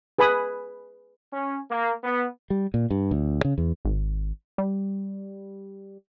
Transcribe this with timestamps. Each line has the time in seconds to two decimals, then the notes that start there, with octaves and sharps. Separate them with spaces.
0.18 G#4 B4 G#5 B5 D#6
1.32 C#4
1.71 A#3
2.03 B3
2.50 G3
2.74 A#2
2.91 G2
3.11 D2
3.45 C#3
3.58 E2
3.85 G#1
4.58 G3